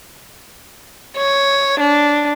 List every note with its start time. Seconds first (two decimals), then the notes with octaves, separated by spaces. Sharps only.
1.17 C#5
1.80 D4